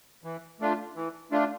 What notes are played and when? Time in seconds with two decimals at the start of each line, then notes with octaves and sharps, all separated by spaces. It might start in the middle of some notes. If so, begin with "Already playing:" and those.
0.24 E3
0.60 A3 D4 F4
0.96 E3
1.31 A3 D4 F4